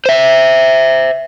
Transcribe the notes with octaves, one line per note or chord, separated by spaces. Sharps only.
C5 E5